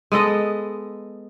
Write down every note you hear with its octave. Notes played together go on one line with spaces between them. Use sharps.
G#3 B3 A4 D#5